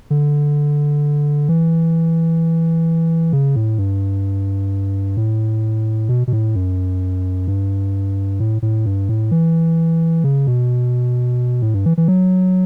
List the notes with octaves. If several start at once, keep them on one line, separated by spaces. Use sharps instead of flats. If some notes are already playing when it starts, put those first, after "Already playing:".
D3
E3
C#3
A2
G2
A2
B2
B2
A2
F#2
G2
A2
A2
G2
A2
E3
C#3
B2
A2
G2
E3
E3
F#3